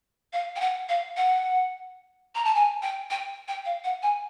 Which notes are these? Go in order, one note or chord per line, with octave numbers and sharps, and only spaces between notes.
F5
G5
F#5
F5
F#5
A#5
A5
G#5
G5
G5
G5
F5
F#5
G#5